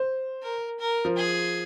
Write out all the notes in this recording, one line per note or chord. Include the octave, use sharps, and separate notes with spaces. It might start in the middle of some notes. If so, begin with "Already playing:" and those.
Already playing: C5
A#4
A#4
F3
G#4